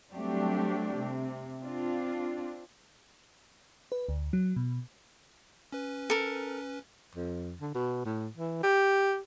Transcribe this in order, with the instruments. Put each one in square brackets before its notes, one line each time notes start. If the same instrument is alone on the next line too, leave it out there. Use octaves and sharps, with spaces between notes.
[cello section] F#3 G3 A3 C4 D4 G4
C3
C4 D4 F4
[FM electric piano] B4
D2
F#3
B2
[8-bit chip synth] C#4 B4
[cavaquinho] A4 A#4
[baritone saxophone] F2
D3
B2
A2
E3
G4